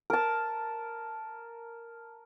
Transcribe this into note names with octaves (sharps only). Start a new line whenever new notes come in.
A#4 A5